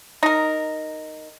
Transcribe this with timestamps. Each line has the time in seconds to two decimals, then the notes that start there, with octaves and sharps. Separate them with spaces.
0.23 D#4 A#4